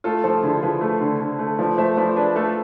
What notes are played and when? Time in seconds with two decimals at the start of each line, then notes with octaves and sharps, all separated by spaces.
0.04 A3 F4 A4
0.24 F3 A4 C5
0.43 D3 E4 G#4
0.62 F3 G#4 B4
0.81 A3
1.01 D3
1.20 D3
1.39 A3
1.58 F3 B4 D5
1.78 A3 C5 E5
1.97 F3 B4 D5
2.16 D4 G#4 B4
2.36 A3 F4 A4